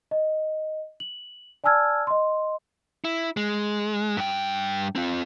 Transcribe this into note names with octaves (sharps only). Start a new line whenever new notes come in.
D#5
F#7
D5 G#5 A5 E6 F6 G#6
D#5 C6
E4
G#3
G2 G5
C4 F4